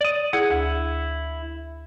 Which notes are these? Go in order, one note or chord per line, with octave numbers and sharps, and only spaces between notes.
D5 D#6
E4 G#4 F#5
D2 E4